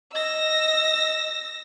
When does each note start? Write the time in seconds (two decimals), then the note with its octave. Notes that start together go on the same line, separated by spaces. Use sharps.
0.13 D#5 E6 A#6